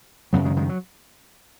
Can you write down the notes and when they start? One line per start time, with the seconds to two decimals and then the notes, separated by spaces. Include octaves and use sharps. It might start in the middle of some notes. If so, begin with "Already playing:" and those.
0.33 F#2 C#3 F#3 B3
0.44 D#3 G#3
0.56 D#3 G#3
0.69 F#3